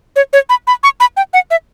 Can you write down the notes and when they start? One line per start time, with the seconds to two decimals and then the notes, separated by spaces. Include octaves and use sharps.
0.16 C#5
0.33 C#5
0.49 B5
0.67 B5
0.83 C#6
1.00 B5
1.17 G5
1.34 F#5
1.51 E5